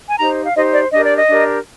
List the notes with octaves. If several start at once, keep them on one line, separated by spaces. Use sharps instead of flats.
G#5
D#4 G4 C5 A#5
F5
D#4 G4 C5 D#5
D5
D4 G4 A#4 D#5
D5
D#5
D4 G4 A#4